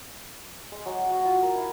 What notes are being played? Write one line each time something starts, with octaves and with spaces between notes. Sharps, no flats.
G#3
F#3
F#4
F4
A#4
E4